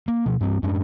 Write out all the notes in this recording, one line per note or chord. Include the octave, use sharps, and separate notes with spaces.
A#3
B2 F3
G2 G3 C4
F#2 G#3 C#4 D4